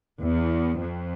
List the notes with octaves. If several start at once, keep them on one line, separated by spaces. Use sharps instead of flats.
E2
F2